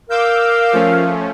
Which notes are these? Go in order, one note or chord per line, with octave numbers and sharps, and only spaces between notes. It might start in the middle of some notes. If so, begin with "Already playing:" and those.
A#4 F5 D6 E6 G6
F3 A3 C#4